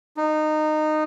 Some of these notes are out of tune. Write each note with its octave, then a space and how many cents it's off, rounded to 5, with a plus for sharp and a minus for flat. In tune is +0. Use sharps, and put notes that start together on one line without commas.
D#4 -20